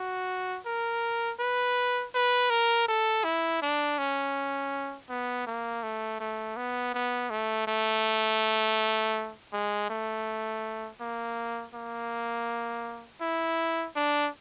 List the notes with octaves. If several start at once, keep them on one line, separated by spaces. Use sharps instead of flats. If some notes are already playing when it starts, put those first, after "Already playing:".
Already playing: F#4
A#4
B4
B4
A#4
A4
E4
D4
C#4
B3
A#3
A3
A3
B3
B3
A3
A3
G#3
A3
A#3
A#3
E4
D4